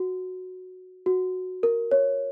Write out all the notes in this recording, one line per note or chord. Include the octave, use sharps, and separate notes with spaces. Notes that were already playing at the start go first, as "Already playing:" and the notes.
Already playing: F#4
F#4
A#4
C#5